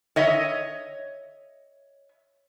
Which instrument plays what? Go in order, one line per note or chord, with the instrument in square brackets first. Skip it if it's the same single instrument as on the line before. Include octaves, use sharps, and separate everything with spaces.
[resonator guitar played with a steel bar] C#5 D#5 E5